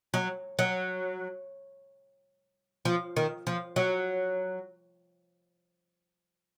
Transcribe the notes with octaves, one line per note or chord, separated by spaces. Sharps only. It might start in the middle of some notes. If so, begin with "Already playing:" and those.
F#3
F#3
F3
D#3
F3
F#3